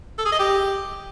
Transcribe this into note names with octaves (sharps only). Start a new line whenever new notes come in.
A4
G#4
D#5
G4